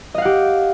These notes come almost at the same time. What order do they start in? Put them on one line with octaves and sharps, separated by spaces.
D#5 F5 F#5 G4